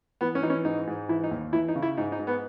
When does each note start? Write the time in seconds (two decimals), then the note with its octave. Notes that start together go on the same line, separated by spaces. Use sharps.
0.21 E3 B3
0.35 C#4
0.43 E3 D#4
0.50 C#4
0.64 G#2 D#4
0.87 G#2
1.09 E3 E4
1.24 D#4
1.31 D#2
1.53 E3 E4
1.68 D#4
1.75 C#3
1.82 E4
1.97 G#2 D#4
2.12 D#4
2.19 G#2
2.27 B3